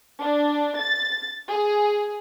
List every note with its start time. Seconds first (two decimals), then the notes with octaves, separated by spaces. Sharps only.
0.22 D4
0.80 A6
1.49 G#4